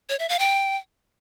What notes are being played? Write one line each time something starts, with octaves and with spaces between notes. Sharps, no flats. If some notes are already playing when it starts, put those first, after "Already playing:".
C#5
E5
F5
G5